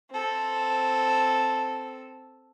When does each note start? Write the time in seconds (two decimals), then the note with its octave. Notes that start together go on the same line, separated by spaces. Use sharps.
0.11 C4 A4